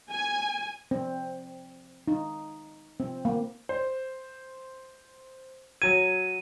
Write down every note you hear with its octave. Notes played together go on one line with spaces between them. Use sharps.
G#5
C4
D#4
C4
A#3
C5
F#3 G#6 D#7